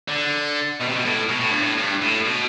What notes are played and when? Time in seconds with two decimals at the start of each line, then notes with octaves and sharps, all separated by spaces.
0.08 D3
0.81 B2
0.89 C3
0.96 B2
1.05 A2
1.29 B2
1.39 A2
1.50 G2
1.61 A2
1.78 G2
2.02 A2
2.26 B2